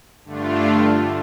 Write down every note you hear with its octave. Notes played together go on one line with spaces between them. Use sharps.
G2 D3 A3 D4 F4